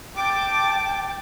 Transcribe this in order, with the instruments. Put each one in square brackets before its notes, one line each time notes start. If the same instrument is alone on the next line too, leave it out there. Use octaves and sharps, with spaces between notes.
[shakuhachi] G5 [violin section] A5 D6 A6